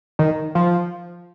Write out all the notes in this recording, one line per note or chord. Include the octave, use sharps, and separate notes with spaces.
D#3
F3